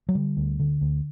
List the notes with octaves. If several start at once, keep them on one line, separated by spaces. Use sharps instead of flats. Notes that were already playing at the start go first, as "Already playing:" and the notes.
F#3
D3 G3
D2
D3
D2